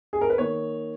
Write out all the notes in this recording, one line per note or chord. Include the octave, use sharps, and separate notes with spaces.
G#4
A#4
B4
D#3 A#3 C#5